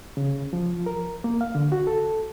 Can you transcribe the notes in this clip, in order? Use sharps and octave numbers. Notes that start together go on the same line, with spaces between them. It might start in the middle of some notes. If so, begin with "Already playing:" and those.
C#3
F3
A#4
A#3
F5
D3
F#4
A4